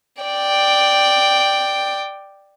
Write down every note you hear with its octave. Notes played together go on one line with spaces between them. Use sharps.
D5 G5